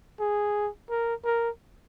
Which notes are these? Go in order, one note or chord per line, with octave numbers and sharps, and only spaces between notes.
G#4
A#4
A#4